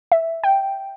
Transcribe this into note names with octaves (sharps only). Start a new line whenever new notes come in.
E5
G5